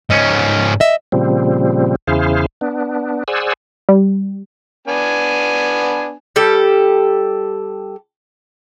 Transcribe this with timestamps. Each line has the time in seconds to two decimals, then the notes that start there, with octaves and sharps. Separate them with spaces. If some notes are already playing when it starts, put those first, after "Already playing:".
0.10 G#2 C#4 D#5
0.80 D#5 E5
1.12 A#2 C#3 F3 G3 C4
2.07 E2 C#3 E4 G#4 C5 F5
2.61 B3 D4
3.28 G#4 C5 D5 F#5 G#5 E6
3.89 G3
4.88 B3 D4 G#5
6.36 G3 G4 A4